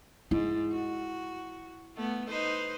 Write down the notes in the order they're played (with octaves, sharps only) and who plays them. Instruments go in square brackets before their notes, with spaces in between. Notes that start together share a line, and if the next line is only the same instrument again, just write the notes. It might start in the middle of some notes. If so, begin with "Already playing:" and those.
[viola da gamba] G#2 [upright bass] E4
[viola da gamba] F#4
A3 B3
D#4 B4 C5